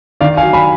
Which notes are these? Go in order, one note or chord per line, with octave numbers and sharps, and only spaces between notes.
D#3 D5 F5
F5 G#5
F#3
G#5 B5